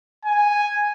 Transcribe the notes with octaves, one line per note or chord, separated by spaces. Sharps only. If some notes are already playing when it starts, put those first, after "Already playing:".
G#5